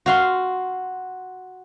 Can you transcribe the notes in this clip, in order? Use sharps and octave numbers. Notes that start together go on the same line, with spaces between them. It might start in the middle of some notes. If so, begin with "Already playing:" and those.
F#4 F5 C6